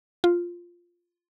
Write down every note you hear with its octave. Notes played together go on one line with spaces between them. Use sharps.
F4